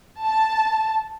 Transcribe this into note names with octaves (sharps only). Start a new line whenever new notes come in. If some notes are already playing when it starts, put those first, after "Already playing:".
A5